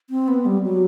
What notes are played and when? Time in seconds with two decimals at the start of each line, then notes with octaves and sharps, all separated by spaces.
0.10 C4
0.28 B3
0.45 G3
0.63 F#3